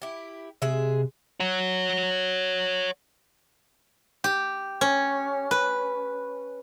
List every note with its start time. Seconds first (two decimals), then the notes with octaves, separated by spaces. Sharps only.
0.02 E4 G4
0.62 C3 G#3 G#4 E5
1.40 C#5 F#5
4.24 G4
4.81 C#4
5.51 B4